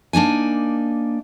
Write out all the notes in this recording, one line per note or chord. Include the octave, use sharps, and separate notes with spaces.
A#3 D4 D#4 G#5